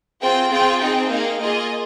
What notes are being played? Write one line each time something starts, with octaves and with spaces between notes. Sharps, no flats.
C4 F4 G#4 G5
C4 F4 G#4 G5
C4 D#4 G#4 G5
A#3 D#4 G#4 F5
A#3 F4 G#4 D#5